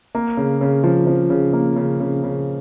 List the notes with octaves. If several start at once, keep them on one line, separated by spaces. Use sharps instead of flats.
A#3
C#3
C#3
F3
F3
C#3
A#3
C#3
C#3
C#3